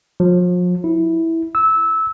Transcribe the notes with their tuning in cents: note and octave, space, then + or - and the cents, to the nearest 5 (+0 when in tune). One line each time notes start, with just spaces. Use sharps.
F3 +40
E4 -10
E6 -15